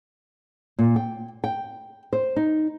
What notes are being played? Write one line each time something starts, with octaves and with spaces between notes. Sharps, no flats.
A#2
G5
G5
C5
D#4